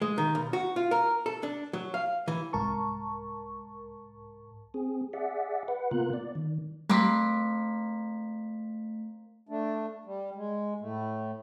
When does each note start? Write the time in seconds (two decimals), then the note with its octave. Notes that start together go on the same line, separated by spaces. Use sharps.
0.02 G#3
0.18 D#3
0.35 B1
0.53 F#4
0.76 F4
0.91 A#4
1.26 A4
1.43 D4
1.73 F#3
1.94 F5
2.28 E3
2.53 C2 G#2 A#4 A5 C#6
4.74 C4 G#4
5.13 G#4 D5 E5 F#5
5.68 B4 F#5
5.91 C3 A#3 B3 F4 A#4 F#6
6.13 D5
6.35 D#3
6.89 G3 A3 A#3 C4 B6
9.49 A3 D4
10.05 G3
10.35 G#3
10.80 A2 A3